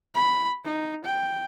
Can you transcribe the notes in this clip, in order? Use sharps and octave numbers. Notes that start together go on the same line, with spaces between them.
B5
D#4
G5